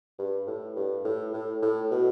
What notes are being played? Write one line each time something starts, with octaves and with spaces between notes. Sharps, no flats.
G2
A2
G2
A2
A2
A2
B2